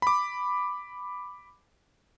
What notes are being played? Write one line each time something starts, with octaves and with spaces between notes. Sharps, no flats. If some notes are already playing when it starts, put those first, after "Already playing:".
B5 D6